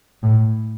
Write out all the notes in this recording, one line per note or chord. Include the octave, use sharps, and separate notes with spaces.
A2